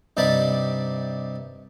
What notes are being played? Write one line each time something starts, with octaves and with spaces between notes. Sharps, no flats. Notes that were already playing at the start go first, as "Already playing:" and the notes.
G2 C3 D#4 D5 A5 B5